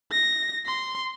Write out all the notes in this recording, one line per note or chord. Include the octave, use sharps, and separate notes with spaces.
A#6
C6